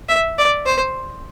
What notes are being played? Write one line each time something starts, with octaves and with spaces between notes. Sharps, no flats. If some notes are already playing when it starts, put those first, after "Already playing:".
E5
D5
C5